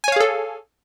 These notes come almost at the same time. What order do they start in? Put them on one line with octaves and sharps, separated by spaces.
G#5 C#5 F5 G#4 A4